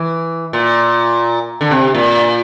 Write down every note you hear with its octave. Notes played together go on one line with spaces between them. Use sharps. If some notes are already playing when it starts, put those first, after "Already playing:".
Already playing: E3
A#2
D3
C3
A#2